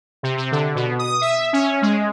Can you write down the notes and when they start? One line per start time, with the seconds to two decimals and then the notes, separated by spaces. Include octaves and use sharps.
0.23 C3
0.37 C3
0.52 D3
0.75 B2
0.99 D#6
1.21 E5
1.53 C#4
1.82 G#3